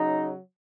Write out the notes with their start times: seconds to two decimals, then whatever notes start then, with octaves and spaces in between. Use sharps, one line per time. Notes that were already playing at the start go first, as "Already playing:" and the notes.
Already playing: C#3 F#3 D#4